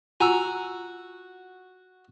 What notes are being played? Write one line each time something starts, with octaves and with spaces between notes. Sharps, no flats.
F4 F#4 G#5 A#5 E6